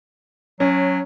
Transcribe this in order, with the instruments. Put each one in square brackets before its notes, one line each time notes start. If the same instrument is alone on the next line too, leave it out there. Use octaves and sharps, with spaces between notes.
[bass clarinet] F#3 [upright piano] C#4